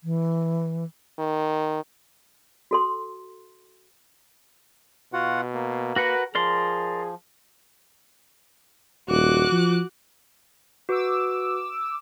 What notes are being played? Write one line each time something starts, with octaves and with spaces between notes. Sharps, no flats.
E3
D#3
F#4 A4 C6
B2 F4 F#4 F#5
A#3
F#4 A#4 B4 F#5
F3 G#4 A#4 D5 C6
D#1 F#4 D6 F#6
F3
F#4 B4 D6 E6